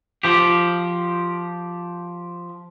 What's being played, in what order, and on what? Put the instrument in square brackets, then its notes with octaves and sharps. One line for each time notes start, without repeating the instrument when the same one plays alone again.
[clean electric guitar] F3 G4